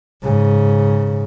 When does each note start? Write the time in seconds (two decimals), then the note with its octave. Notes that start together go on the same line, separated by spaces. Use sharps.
0.23 G#2 C#3